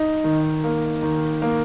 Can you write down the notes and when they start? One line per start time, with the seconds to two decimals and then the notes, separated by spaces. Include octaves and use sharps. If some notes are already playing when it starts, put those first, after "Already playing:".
Already playing: D#4
0.24 D#3
0.64 A#3
1.02 D#3
1.42 A#3